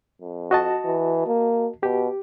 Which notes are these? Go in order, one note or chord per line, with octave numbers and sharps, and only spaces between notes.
F2
F#4 D#5 A5
E3
A#3
B2 G4